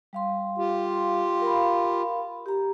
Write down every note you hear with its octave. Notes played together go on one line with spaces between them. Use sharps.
G3 F5 C6
F4 G4
A#4 F5 B5
G4 A#5